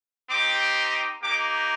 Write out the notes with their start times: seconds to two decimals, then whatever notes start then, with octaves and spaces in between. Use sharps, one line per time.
0.30 C4 D#4 G4 D6
1.22 A#3 D#4 G4 D6